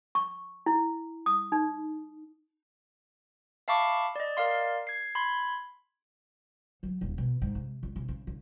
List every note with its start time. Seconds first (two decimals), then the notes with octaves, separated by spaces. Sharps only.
0.15 C#6
0.66 E4
1.26 D#6
1.52 D#4
3.68 E5 F5 A5 B5 C#6 D6
4.16 D5 D#5
4.37 A#4 D5 F5 C6
4.87 G#6 C7
5.15 B5 C6 G#6
6.83 F#3
7.01 D#1
7.18 B2
7.42 G#2
7.55 C3
7.83 C#2
7.96 C3
8.08 C#3
8.27 C#3